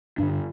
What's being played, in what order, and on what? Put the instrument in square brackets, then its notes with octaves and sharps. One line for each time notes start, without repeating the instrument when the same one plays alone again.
[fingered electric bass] G2 D3 D4